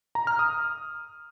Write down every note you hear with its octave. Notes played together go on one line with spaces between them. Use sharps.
A#5
F6
D#6